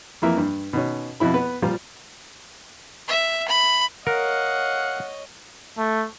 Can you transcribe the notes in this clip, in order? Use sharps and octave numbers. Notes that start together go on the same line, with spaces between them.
F2 E3 A#3 E5
G2
B2 D#3 C#4
F2 B2 E4 B5
B3 B4
A#2 F3 G3 F4
E5
B5
A#4 C#5 D#5 F5 F#5
A3